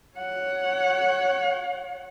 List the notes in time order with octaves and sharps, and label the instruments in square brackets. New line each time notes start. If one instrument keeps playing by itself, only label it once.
[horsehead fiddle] C#5 F#5